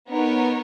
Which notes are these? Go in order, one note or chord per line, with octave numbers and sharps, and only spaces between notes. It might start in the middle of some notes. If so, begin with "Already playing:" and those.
B3 D#4 A#4 C#5